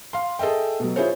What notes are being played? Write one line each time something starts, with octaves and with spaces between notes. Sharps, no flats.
F5 C6
G#4 A4 D#5 E5 G5
B2 F#3
E4 F4 G#4 C5 C#5